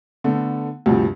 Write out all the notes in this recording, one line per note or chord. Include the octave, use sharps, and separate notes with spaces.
D3 A3 B3
D2 G2 C3 F3